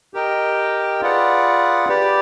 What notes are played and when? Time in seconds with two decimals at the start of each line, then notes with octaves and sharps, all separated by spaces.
0.14 G4 A#4 D#5 G5
1.01 F4 G#4 B4 D5 F#5
1.89 G4 B4 D5